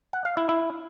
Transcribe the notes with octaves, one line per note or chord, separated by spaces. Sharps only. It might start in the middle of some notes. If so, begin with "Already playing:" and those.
F#5
F5
E4
E4